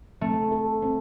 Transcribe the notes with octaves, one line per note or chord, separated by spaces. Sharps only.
A3 C4
A4
C4